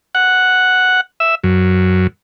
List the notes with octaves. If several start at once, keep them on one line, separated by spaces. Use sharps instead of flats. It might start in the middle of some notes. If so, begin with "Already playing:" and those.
F#5
E5
F#2